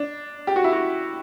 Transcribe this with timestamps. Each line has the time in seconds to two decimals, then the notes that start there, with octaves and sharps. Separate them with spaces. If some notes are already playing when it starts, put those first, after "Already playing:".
Already playing: D4
0.47 G4
0.56 F#4
0.64 E4
0.73 F#4